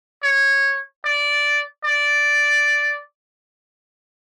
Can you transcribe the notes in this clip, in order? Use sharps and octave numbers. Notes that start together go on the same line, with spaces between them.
C#5
D5
D5